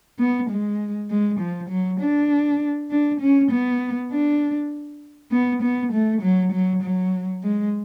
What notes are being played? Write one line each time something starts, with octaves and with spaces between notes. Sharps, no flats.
B3
G#3
G#3
F3
F#3
D4
D4
C#4
B3
D4
B3
B3
A3
F#3
F#3
F#3
G#3